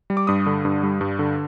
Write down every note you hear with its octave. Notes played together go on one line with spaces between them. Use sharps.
G3
D6
G2 D#6
D3
G2
G3
G2
D3